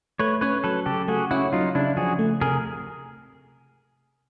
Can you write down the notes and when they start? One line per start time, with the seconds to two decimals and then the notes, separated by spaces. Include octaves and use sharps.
0.20 A3 B4 C#5
0.41 C#4 B4 C#5
0.64 F#3 A4 B4
0.86 C#3 G4 A4
1.08 A3 F#4 G#4
1.31 C#4 E4 F#4
1.53 F#3 D#4 F4
1.75 C#3 D4 E4
1.97 F3 F#4 G#4
2.19 A3
2.41 C3 G#4 A#4